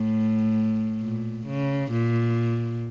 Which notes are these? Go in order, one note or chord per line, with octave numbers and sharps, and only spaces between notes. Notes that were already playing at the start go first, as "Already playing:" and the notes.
Already playing: A2
A#2
C#3
A#2